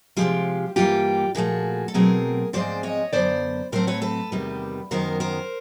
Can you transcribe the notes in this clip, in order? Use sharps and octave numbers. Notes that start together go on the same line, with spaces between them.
C3 F3 G#3 F4 G4
G2 E3 G3 A#3 F4 G4
A#2 F3 A3 F#4 G#4
A4
B2 F#3 A3 C4 G#4 A#4
G#2 F3 G#3 C4 C5 D5
C#5 D#5
F#2 D3 F#3 B3 C5 D5
A2 F#3 A3 C4 A#4 C5
B4 C#5
A4 B4
E2 C3 D#3 G3 B3
F#2 D#3 F#3 B3 A#4 C5
A#4 C5